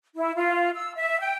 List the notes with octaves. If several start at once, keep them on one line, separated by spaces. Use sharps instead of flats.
E4
F4
E6
E5
G5